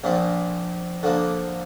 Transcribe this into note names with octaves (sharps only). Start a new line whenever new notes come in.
A#1 A#2 F3
D3 F3 A#3